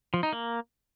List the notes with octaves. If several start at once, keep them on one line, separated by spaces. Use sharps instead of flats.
F3
D#4
A#3